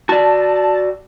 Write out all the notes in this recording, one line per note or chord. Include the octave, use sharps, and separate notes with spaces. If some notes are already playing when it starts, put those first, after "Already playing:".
F#4 D5 A5